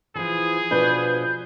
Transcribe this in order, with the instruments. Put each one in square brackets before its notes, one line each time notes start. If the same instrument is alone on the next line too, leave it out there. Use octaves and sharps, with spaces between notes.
[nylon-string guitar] E3 F3 [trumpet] G#4
[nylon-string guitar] B2 F3 D4 [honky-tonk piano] B4 [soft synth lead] G6